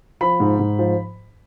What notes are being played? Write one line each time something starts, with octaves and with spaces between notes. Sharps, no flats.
F3 B5
G#2
G#2
F3